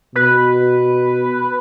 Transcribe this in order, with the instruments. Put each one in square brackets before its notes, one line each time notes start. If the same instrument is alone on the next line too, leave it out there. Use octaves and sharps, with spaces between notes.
[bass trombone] B2 [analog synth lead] B4